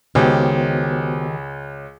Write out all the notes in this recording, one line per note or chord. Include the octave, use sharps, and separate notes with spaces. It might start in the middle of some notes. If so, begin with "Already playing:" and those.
C#2 D#3 B3 F#4 G4 C5